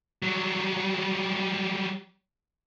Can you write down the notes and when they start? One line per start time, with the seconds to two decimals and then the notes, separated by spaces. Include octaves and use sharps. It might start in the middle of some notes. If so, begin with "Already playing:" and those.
0.22 F#3 G3